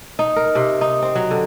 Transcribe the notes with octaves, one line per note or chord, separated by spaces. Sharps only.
D#4
A#4
C3
D#4
C4
F#3
D3